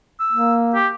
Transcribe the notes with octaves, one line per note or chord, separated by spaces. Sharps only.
E6
A#3
G4